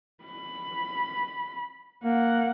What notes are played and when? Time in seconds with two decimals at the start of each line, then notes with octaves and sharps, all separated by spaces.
0.24 B5
2.04 A#3 F#5